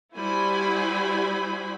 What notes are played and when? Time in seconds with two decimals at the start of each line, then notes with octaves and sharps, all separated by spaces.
0.16 G3 E4 F#4 C5 G#5 B5